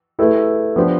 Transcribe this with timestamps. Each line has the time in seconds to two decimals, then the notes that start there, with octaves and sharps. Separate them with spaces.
0.19 A3 E4 G4 B4
0.76 F3 B3 D4 G4 C5